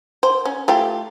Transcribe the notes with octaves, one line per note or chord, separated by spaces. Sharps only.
C5
C#4
A3 F4 G4